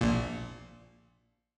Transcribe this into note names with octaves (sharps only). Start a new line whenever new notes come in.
A#1 A#2